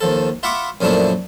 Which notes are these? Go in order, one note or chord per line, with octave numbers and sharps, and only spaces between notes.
D#2 F3 A4
F4 E5 F#5 B5 C#6 D6
F#2 A#2 F3 A3 D4 E4